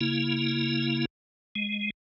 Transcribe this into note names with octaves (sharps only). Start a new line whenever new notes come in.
C#3 A#3 E4
G#3